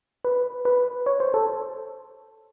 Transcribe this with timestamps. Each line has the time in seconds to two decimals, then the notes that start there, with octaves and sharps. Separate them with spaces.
0.25 B4
0.65 B4
1.06 C#5
1.20 C5
1.34 A4